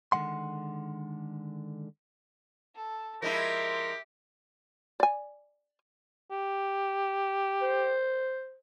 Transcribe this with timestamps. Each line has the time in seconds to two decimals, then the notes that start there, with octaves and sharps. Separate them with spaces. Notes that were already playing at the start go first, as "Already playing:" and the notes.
0.12 D3 D#3 G#3 F#5 C6
2.75 A4
3.22 F3 G#3 E4 G4 A#4 E5
5.00 D5 G#5
6.31 G4
7.62 C5